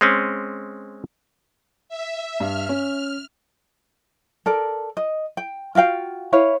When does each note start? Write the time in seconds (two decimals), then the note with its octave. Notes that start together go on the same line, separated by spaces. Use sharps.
0.01 G#3 C4 C#4
1.89 E5
2.40 G2 F6
2.69 C#4
4.46 A4 A#4 D5
4.97 D#5
5.37 G5
5.75 F4 F#4 F5 G5
6.32 E4 B4 C#5 F5